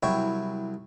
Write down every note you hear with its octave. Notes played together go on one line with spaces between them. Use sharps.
C2 F#3 E4 C#5 G5